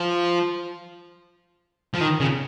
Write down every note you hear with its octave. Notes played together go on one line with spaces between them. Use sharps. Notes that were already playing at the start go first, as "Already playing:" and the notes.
Already playing: F3
F3
D#3
C#3